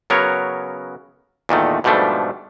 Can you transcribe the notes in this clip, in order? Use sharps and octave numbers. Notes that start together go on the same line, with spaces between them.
C#3 F#3 B3 A#4 C#5
E2 A#2 D#3 A3
G#2 B2 F3 G3 A3 D4